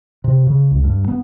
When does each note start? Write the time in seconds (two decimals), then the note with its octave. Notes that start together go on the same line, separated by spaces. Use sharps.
0.24 C3
0.47 C#3
0.71 C#2
0.84 G2
1.08 B3